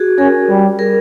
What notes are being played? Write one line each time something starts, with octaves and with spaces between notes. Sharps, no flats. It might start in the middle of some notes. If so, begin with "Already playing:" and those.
Already playing: F#4 G#4
C#4 G#4 A#4
G3
G#4 A#4